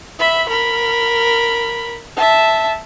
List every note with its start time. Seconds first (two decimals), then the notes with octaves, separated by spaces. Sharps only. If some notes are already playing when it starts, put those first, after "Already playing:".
0.19 E5 B5
0.49 A#4 B5
2.16 E5 A5